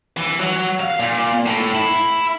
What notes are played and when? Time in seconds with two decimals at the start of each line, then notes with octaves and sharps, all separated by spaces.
0.17 E3
0.40 F#3
0.80 F5
1.00 A#2
1.46 A2
1.75 E4